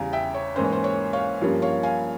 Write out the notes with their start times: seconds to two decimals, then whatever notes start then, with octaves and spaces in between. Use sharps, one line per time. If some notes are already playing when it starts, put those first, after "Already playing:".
Already playing: E2 C#3 G3 F5 G#5 A#5
0.13 E5 G5
0.34 C#5
0.56 G#2 E3 A#3 C#4 C5
0.64 C#5
0.73 C5
0.84 C#5
1.13 C#5 F5
1.41 G2 F3 A#3 C#4
1.62 C#5 F5
1.83 F5 G#5